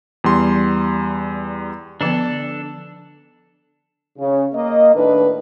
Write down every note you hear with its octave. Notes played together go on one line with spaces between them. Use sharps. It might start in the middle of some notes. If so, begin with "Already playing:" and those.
E2 G3 C6
D3 F3 B3 D4 A4
C#3
A#3 D#5
A2 D#3 D4 E4 B4